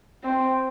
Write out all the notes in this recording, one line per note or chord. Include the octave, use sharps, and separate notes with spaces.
C4